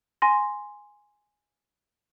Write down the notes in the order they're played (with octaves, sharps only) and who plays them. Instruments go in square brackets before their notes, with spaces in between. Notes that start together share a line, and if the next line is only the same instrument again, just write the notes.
[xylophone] G#5 C6 A#6